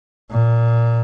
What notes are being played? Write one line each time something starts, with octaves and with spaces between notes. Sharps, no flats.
A#2